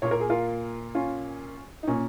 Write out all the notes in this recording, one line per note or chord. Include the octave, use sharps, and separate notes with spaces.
A#2 A#3 C#5
A#4
G#4
F4 A#4
C#4 F4
D#4
A#2 A#3 C#4